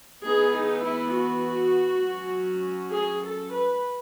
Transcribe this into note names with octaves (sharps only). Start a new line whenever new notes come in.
E3 B3 D#4 G#4
D#4
E4
F#4
F#3 C#4
G#4
A4
B4